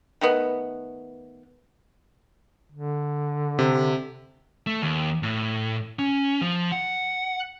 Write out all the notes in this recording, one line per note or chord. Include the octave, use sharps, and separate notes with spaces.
D#3 A3 B3
D3
C3
A3
D#2
A2
C#4
F3
F#5